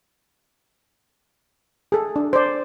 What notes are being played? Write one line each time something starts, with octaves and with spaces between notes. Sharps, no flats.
G#4 A4
D4
C5 D5